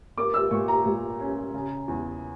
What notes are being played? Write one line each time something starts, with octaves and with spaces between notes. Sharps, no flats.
A#3 D6
E6
A#2 C#6
A#5
A#2
C#4
C#3
E2